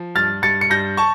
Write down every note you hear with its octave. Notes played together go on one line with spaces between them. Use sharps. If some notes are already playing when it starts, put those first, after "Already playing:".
Already playing: F3
G2 F6 A6
G2 A6 C#7
C#7
G2 G6 A#6
A5 C#6